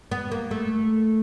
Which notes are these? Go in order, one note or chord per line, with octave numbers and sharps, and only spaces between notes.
B3
A#3
A3